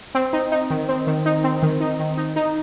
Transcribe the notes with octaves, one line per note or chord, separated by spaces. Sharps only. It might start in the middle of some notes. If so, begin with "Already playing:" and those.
C4
D#4
D#4
D#3
C4
D#3
D#4
C4
D#3
D#4
D#3
D#4
D#4